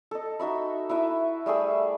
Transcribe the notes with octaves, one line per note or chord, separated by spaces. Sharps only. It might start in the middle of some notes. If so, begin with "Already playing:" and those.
A4 D#5
D#4 F#4 E5 B5
E4 B4 E5
G3 A3 G#4 E6